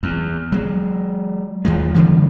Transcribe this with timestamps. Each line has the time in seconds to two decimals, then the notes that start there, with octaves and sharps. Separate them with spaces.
0.03 E2
0.52 F#3 G#3
1.65 D#2 D#3 F3 G#3
1.94 C#3 E3 G3 A#3